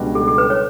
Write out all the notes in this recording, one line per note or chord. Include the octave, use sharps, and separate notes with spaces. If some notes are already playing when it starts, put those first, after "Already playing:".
Already playing: C#2 B2 G3 D4 F#4
A4
A4
B4
C#5